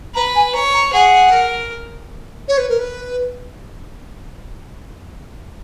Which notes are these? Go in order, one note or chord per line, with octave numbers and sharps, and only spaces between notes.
B4 A#5
G#5
C#5 A#5
A#5
G#4 F#5
A#4
C#5
B4
A#4
B4